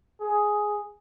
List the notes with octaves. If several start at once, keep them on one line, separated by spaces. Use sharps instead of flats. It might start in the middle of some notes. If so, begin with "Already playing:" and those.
G#4